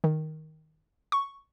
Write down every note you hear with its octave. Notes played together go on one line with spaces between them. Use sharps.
D#3
C#6